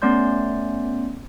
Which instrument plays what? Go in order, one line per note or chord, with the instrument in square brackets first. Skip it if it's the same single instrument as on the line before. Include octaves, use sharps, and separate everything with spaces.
[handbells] A3 B3 C#4 D5 C6 G6